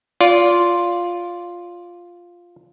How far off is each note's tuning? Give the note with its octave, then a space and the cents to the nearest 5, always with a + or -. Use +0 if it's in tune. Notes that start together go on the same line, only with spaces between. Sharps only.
F4 +0 D5 -25